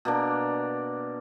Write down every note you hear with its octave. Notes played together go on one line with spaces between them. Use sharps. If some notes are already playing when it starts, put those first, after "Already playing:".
B2 A#3 D4